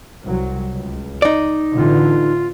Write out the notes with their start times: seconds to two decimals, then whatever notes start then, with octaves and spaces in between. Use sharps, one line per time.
0.24 C2 F#3
0.73 C#2
1.22 D#4 D5
1.76 A1 D3 E3 F4